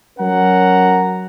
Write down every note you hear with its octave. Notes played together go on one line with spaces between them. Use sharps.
F#3 C#4 A#4 F#5 A#5